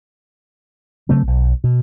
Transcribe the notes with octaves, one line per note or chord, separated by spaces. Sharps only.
C#3 F#3 A3 C4
B1
B2